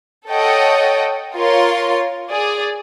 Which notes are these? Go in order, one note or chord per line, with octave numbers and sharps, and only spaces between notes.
A4 C#5 D#5 F#5 G5
F4 A#4 C#5 C6
G#4 D5